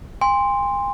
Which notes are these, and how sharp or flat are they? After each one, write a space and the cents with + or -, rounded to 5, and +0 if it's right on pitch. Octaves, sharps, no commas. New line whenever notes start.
G#5 -45 C6 +0